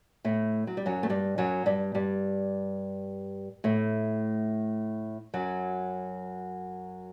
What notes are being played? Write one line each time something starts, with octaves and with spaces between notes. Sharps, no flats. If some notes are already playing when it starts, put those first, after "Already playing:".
A2 A3
F#3
G3
F#2 F#3
A3
G2 G3
F#2 F#3
G2 G3
G2 G3
A2 A3
F#2 F#3